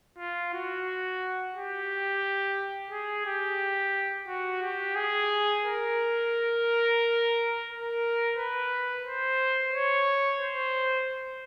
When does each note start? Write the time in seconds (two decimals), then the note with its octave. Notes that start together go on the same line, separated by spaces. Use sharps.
0.18 F4
0.53 F#4
1.55 G4
2.91 G#4
3.26 G4
4.28 F#4
4.62 G4
4.95 G#4
5.64 A#4
7.69 A#4
8.36 B4
9.06 C5
9.74 C#5
10.41 C5